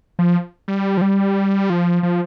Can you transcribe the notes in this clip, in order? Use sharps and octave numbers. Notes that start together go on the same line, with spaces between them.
F3
G3
F3
G3
F3
F3